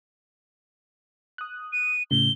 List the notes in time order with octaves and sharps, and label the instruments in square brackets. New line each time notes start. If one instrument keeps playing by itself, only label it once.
[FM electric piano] D#6 F#6
[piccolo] D#7
[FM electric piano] A2 C#3 [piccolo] G7